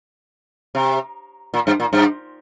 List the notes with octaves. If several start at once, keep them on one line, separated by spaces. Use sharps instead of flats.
C3
A#2
G2
A#2
G2